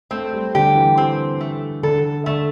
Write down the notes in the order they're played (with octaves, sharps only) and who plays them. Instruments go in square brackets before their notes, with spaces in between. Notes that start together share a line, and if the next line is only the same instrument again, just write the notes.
[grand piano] A3 [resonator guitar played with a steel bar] C4
[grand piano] G3
[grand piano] D3 [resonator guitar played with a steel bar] G4
[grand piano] E3
[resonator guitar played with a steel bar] C4
A3
[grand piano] D3 [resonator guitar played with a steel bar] A4
[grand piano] D3 [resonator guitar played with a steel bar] A3